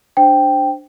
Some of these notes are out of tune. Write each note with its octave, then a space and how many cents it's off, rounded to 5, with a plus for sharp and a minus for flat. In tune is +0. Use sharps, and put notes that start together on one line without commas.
D4 +0 C5 +0 G5 +0